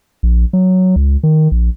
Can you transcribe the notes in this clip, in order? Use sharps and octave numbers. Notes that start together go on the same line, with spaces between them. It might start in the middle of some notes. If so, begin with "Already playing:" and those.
A#1
F#3
C#2
D#3
A#1